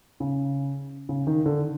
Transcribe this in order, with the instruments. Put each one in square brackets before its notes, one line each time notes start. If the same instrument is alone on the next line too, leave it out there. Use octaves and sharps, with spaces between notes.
[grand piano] C#3
C#3
D#3
D3